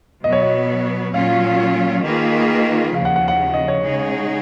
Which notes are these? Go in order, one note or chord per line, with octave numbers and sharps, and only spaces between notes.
B2 F#3 B3 D#5
C#5
D#5
A#2 F#3 C#4 F4 F5
D#3 A#3 F4 G#4 B4
D#2 C#3 F3 F5
F#5
F#5
F#5
D#5
C#5
C#3 G#3 D#4 G#4